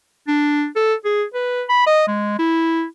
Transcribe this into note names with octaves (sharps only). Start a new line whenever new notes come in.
D4
A4
G#4
B4
B5
D#5
G#3
E4